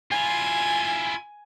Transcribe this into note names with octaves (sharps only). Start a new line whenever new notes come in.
E4 F4 G#5